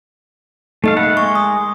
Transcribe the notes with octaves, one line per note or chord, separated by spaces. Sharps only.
A3 D#4 D#5 F5
A#3 F#5
G#3 C#6
D#6